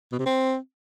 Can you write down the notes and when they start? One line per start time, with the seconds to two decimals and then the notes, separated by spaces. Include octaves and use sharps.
0.12 B2
0.19 C3
0.26 C4